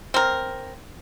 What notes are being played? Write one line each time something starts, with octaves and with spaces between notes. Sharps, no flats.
C4 A#4